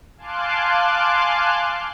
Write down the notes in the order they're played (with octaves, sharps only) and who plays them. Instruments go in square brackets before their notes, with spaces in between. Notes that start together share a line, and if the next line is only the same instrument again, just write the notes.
[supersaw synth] F5 G#5 A5 C6 D6 F#6